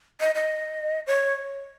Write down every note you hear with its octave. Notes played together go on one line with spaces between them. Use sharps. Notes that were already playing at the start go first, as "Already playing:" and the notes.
D#5
D#5
C#5